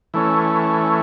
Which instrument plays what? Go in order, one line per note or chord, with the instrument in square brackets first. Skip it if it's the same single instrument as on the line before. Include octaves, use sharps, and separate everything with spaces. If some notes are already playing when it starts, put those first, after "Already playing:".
[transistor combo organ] E3 A3 C#4